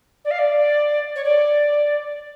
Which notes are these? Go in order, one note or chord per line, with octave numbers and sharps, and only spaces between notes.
D5
F5
D5
C#5
D5